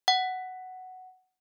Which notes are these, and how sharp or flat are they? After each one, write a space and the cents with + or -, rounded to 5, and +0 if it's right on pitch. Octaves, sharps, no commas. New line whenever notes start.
F#5 +5